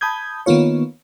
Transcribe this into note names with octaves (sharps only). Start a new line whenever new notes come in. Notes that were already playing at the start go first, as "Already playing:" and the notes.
A5 B5 D#6 G6 G#6
D#3 A#3 B3 F4 C#5